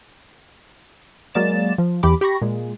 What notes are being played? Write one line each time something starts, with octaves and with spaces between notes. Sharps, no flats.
F#3 G#3 A#3 D5 A6 E7
F3
E2 E3 G4 B5 D6
G4 B5 C#6 A#6
A#2 G#3